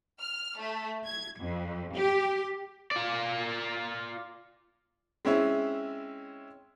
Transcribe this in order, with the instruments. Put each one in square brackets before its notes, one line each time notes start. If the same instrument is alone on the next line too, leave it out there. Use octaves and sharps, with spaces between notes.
[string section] F6
A3
G#6
F2
G4
[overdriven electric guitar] F4 D5
[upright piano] G#3 C4 C#4 E4